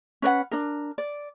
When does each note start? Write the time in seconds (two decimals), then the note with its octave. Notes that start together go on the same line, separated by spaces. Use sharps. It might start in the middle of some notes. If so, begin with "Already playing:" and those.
0.22 C#4 B4 D5 F#5
0.51 D4 A#4
0.98 D5